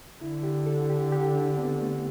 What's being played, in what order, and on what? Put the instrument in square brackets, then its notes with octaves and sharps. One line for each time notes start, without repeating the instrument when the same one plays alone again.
[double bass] D3 [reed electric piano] E4
[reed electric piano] G4
A4
G4
G4
D4
C4
B3
A3